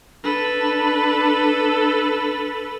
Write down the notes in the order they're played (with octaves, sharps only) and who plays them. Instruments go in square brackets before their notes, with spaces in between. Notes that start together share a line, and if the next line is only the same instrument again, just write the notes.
[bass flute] D4 [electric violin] A4 B4